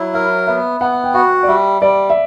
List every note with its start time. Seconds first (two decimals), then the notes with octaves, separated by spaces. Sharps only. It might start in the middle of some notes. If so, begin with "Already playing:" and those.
Already playing: F#3 E4
0.14 A#4 E5
0.47 B3 E5
0.80 B3 F#5
1.04 G5
1.14 F#4 F#5
1.43 D5
1.47 G3 E5
1.82 G3 D5
2.10 E5